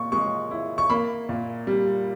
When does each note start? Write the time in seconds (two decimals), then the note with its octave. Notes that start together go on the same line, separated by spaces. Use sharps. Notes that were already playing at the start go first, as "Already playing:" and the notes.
Already playing: A#2 C#6
0.12 G#3 C#6
0.51 E4
0.78 C#6
0.90 A#3 B5
1.29 A#2
1.67 G3